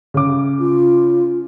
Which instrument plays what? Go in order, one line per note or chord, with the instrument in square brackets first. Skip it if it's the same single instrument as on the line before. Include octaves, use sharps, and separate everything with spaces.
[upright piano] C#3 D6
[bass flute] F4